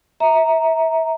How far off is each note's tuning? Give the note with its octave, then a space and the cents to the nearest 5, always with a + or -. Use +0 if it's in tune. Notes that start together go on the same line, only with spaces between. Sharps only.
E5 -25 A#5 +0